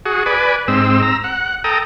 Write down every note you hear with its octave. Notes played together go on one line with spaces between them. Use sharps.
F#4 G#4
B4 D5 G#5
G#2 C4 E6
A#5 E6
F#5
A4 G5 A#5 D#6